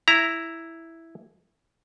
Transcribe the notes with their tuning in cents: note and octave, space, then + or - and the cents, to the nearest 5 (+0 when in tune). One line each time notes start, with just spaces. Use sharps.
E4 +0 A#5 +0